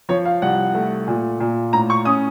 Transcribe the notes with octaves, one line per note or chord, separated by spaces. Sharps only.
F3 C#5
F5
C2 F#5
A3
A#2
A#2
A2 A#5
C#6
C#4 D#6